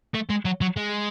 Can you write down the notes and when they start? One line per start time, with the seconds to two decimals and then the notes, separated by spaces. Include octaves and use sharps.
0.15 A3
0.30 G#3
0.45 F#3
0.61 F#3
0.76 G#3